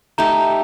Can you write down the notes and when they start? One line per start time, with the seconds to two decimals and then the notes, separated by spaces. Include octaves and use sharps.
0.18 A3 D#4 G4 A#5